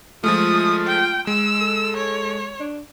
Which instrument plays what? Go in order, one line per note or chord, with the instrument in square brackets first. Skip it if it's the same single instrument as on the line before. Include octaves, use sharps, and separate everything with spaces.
[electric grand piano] F3 G#3 A3 [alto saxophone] F4 [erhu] D#6
[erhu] G5
[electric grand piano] G#3 [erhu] E6
[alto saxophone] A4
[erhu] C#5
[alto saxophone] D4